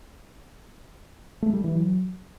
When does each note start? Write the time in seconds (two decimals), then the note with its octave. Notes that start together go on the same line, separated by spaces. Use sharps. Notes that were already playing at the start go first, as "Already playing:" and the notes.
1.42 A3
1.53 G3
1.64 E3
1.75 F#3